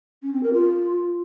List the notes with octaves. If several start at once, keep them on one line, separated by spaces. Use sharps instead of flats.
C#4
C4
A#4
F4